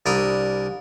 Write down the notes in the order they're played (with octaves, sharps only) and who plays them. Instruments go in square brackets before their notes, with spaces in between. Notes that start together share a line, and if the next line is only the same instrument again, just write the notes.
[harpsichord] C2 D4 A#4 B5 D#6